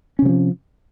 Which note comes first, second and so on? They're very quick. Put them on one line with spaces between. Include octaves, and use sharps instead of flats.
C#4 C3 F#3 F3